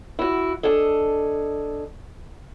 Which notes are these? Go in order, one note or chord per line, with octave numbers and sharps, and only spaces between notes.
E4 F#4
D4 G#4 A4 D#5